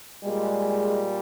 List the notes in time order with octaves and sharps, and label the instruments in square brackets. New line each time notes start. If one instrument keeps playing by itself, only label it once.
[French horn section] A#2 G3 G#3